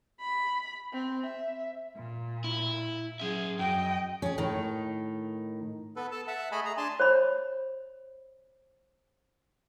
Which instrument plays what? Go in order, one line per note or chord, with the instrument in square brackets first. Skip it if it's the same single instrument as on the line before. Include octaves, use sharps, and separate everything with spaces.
[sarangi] B5
C4
E5
[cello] A#2
[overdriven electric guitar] E4
[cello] F#3 G#4 [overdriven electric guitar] C#4 E5
[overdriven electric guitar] F#2 [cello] D#5 G5
[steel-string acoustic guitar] C#4 G#4
A2 D#3 D#4
[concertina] B3 A4 B4
A4 A5
E5 F#5 A5
A3 G#4 D#5 G#5 B5
G#4 A#5
D4 G#5 A5 C6
[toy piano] C5 C#5 B5